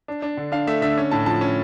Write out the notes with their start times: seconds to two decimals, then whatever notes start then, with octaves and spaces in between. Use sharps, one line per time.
0.08 D4
0.22 D4
0.37 D3
0.52 D4 F5
0.67 A3 E5
0.82 D3 E5
0.98 C#4
1.11 A2 A5
1.26 F3 A5
1.41 C#4